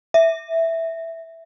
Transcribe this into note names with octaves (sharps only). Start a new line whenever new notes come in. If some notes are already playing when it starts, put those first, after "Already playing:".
E5